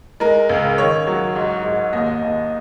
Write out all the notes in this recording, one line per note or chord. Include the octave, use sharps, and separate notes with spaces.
G#3 A#4
C#2
D#3 C#5
F#3
G#2
G#2
D#2 D#5
D#2